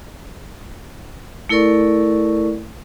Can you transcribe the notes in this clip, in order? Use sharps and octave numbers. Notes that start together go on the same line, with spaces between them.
A3 E4 A4 A#4 D5 C#6